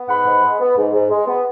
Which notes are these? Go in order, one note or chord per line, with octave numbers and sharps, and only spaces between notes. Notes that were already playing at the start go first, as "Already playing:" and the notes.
Already playing: B3
G#2 F#5 B5
G#2
G#3
B3
G#2
G#2
G#3
B3